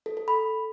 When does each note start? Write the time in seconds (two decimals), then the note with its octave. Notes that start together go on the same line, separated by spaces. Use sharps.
0.06 A4
0.17 A4
0.28 B5